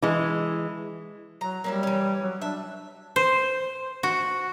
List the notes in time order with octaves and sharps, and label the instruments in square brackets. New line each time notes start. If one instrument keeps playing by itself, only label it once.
[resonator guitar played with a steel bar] E3 G#3
[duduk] F#3 [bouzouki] A#5
[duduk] G3 [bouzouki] A#3 C#4 E4
[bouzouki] E3 C#4
[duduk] F#3
[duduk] D4 [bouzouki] E5
[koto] C5
F#4